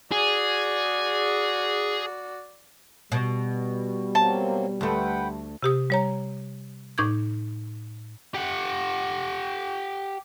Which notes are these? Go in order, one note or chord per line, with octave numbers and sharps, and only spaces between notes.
F#4 G#4 D5
B2 G3
F#3 A#3 C4 A5
D2 A3 B4 F#5 G5
C3 G4 D#6
G3 C#5 A#5
A2 D#4 D6 G6 G#6
G4 F#5